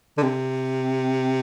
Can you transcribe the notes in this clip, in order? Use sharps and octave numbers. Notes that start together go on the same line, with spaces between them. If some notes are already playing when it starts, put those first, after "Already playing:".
D3
C3